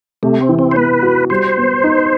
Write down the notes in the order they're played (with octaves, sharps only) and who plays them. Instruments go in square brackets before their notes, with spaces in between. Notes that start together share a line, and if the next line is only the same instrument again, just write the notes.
[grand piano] C3 [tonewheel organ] A3
[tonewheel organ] C4
[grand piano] E3
[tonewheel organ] C4
C5
[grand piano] B3 [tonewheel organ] B4
[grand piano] F#4
[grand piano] G3 [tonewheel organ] C5
[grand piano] B3
D#4